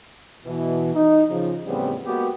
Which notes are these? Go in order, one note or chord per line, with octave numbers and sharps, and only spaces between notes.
B2 E3
D#4
C#3 F3
E2 A2 C#3 G3 B3 C4
G#3 A#3 B3 F#4 G4